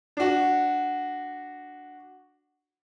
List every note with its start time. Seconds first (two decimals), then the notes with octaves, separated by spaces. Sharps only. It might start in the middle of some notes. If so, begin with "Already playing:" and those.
0.17 D4 F#4